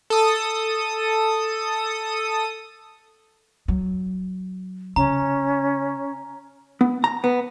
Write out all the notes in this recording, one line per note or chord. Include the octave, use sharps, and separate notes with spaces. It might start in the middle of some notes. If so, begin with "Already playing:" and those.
A4 D#6
F#3
C#3 C#4 A#5
B3
A#5
B3